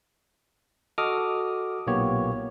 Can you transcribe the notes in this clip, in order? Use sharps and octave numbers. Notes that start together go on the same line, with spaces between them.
F#4 A4 D#5 D6 D#6 F6
B1 A#2 A#3 B3 G4 C#5